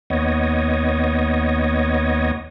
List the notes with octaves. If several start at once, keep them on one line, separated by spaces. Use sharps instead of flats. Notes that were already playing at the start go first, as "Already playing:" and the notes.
D#2 B3 C#5 D#5